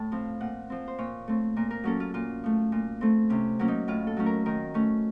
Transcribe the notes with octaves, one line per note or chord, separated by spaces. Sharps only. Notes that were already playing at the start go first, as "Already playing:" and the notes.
Already playing: A2 A5
F3 C4
A#2 F#5
F3 C4
C5
A#2 C#5
A3 C4
A#2 A#4
A#4
F#3 A#3 C#4 A4
F4
A#2 F4
F3 A3
A#2
A3 C4
C3 C#4
F#3 A#3 C#4
D#4
A2 F4
A4
F#3 A3 C#4
A#4
D#3 A#4
A3 C#4